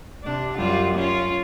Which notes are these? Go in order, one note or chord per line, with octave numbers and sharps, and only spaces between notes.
C3 D4
F#2 G3 F4
C#4 F4